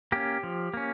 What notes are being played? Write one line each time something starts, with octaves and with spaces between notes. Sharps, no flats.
A#3 C#4 G4
F3
A#3 C#4